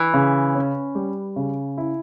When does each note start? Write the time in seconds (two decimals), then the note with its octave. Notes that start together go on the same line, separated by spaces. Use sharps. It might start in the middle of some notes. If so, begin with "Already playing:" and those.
Already playing: E3
0.14 C#3
0.55 C#4
0.95 G3
1.36 C#3
1.78 E4